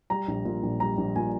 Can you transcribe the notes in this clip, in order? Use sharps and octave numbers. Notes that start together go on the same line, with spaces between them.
G3 A#5
A#1
A#2
A#1
G3 A#5
A#1
A#2 G#5